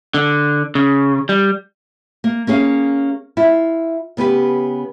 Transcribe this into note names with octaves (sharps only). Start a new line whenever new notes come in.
D3
C#3
G3
A#3
A#3 C#4 G#4 F5
E4 F4
C#3 B3 G4 B4